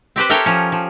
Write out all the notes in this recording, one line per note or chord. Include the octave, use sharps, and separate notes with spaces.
C4 G4 B4 C5
A4 A#4 C#5 E5 G5
F3 C#4
F3